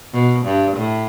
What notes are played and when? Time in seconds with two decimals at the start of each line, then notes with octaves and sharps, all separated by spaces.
0.13 B2
0.45 G2
0.77 A2